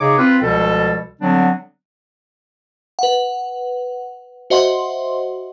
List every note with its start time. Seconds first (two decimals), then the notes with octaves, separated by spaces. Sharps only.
0.01 C#3 D#4 G#4 C#5 D#5 D6
0.18 C4 F4 B4
0.42 C#2 B2 F3 G3 A4
1.21 D3 F#3 G3 B3 C4 D4
2.99 B4 F#5
4.50 F#4 C5 D#5 E5 F#5 C6